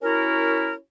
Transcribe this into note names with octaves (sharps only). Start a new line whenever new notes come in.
C#4 E4 F#4 A#4